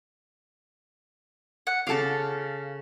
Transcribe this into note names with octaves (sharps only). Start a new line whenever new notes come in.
F#5
C#3 A4 F5 A5 D6